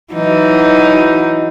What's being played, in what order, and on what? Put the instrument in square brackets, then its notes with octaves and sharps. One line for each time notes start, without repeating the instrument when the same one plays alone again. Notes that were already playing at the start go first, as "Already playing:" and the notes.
[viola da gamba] E3 F#3 D#4